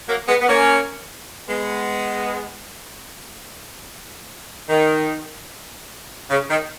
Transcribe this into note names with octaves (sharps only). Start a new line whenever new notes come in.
F#3 A#3
G#3 B3
B3
A#3 C#4
G#3 B3
D#3
C#3
D#3